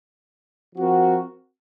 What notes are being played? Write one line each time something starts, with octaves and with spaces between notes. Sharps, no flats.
F3 C4 F#4 A#4